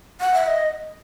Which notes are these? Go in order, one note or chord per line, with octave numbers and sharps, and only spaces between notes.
F#5
E5
D#5